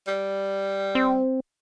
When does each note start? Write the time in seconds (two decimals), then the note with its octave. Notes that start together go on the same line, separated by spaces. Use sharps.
0.07 G3
0.95 C4